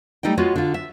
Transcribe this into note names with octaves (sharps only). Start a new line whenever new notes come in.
G3 A3 D#4 D#5 G5
G#3 B3 F4 F#4 C#5
D3 F4
E5